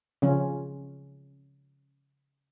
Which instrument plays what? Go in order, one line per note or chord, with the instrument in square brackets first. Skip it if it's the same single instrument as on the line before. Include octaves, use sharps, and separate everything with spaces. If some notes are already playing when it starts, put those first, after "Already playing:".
[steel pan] C#3 F3 C#4 F4